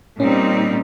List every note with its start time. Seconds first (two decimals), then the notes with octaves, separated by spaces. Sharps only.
0.20 A#2 G3 C4 C#4 D#4